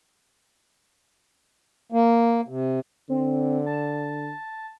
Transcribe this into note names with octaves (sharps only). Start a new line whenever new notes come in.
A#3
C3
D3 C4
A5